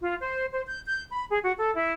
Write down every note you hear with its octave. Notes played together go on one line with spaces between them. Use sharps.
F4
C5
C5
G6
G6
B5
G#4
F#4
A4
E4